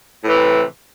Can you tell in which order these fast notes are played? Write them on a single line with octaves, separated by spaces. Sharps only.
A2 E3 C3